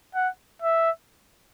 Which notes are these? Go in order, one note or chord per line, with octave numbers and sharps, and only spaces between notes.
F#5
E5